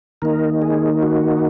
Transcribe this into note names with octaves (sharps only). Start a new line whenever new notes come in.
D#3 A#3 D#4 A#4
G#4
F#4